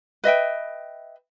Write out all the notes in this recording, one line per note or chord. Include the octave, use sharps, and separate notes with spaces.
B4 D#5 E5 G5